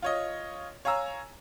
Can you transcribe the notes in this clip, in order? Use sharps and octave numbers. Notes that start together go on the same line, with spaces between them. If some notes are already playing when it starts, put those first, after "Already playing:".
F4 C#5 D#5
C#5 F5 G#5 A#5 E6